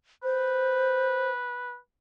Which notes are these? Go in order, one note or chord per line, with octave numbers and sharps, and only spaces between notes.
B4 C5